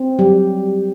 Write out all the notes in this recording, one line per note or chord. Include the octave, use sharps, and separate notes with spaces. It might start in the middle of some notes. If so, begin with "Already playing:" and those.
Already playing: C4
F#3 G3 G4